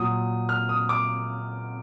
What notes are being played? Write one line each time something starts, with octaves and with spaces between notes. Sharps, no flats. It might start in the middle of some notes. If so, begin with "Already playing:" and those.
Already playing: A#2 F#3 D#6
F6
D#6
D6